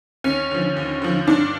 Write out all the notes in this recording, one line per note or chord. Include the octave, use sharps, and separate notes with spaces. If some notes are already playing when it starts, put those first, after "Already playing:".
D#2 C#4
D3 F3
D#2
D3 F3
G2 D4